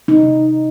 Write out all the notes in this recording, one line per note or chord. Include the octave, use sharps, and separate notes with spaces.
C3 D#4